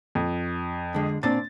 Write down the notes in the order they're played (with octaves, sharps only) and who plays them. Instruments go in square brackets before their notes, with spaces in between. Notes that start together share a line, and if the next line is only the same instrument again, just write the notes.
[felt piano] F2
[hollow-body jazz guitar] D3 G#3
[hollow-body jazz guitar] A#2 C4 D4 [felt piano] A6